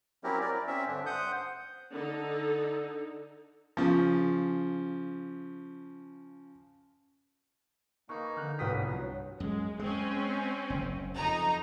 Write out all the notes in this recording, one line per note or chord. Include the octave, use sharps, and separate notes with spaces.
F#3 C4 C#4 E4 G4 A#4
A#4 D5
E4
C4 C#4 E5
G2 D3 D4
C5 F#5 D#6 G6
D3 D#4 A4
C#3 F3
A#3 D#4 G#4 B4 F5 C#6
D3 F6 F#6
C2 G2 F#3 B3 G5 D#6 B6
F3 F#3 F#4
F#2 G#3
G#3 C4 C#4
F#1
F2 D#4 A#5